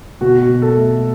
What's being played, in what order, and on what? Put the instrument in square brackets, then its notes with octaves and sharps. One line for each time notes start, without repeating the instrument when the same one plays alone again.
[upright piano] B2 F#4
B2
A4
A3